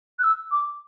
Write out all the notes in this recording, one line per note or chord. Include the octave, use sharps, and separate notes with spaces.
F#6
E6
D6